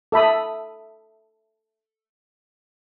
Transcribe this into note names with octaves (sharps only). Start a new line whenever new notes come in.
A4 E5 B5 D#6